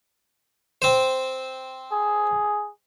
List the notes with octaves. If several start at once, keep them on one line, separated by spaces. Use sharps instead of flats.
C4 C5
G#4